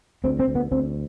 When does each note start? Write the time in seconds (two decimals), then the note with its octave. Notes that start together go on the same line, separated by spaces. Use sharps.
0.24 D2 C4
0.39 C4
0.48 D2
0.55 B3
0.71 D2 C4